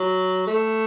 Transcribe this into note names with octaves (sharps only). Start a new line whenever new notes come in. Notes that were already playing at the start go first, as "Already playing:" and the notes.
Already playing: F#3
A3